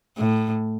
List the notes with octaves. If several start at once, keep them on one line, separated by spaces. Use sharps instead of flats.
A2